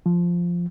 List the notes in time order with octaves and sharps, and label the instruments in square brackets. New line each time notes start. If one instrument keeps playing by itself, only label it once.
[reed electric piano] F3